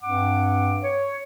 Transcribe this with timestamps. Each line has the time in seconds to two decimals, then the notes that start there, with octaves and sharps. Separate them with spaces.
0.03 G2 C4 F#5 D6
0.82 C#5